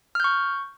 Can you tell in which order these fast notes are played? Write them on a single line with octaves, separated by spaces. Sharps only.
F6 G6 C#6